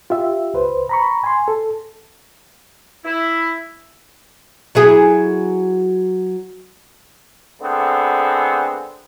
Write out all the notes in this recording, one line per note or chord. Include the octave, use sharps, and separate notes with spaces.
F4 G4 E5
C#2 B4 C5
A#5 B5 C#6
G#5 C6
A4
E4
F#3 E4 G#4
D3 A3 B3 C4 G#4